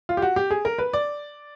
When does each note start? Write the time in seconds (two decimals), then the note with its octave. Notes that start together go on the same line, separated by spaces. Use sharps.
0.09 F4
0.17 G4
0.22 F#4
0.36 G4
0.51 G#4
0.65 A#4
0.78 B4
0.93 D5